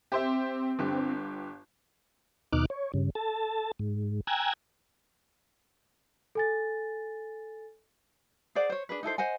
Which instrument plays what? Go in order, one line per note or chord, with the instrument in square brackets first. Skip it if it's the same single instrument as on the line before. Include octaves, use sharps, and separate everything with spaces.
[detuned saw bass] C4 [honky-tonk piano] G4 C5 E5
[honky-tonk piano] G1 D3 G4
[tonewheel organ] D#2 B2 D#4 D6 F6 F#6
C#5
G2 C#3
A4 A5
G#2
G5 G#5 A#5 E6 F#6 G#6
[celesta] A4 G#5 A6
[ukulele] G#4 C5 D5 F#5
C5 C#5
D4 G#4 B4
D#4 E4 A4 C5
C5 D#5 F#5 G#5